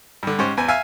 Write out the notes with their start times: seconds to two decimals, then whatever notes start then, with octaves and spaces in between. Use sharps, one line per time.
0.23 G2 D3
0.39 G#2 C#4 G4 C5
0.57 E2 B4 G#5
0.68 E5 F5 G#5